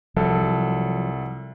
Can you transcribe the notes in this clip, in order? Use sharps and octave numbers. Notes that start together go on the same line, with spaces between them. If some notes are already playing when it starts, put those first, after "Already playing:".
C2 F3 F#3 A4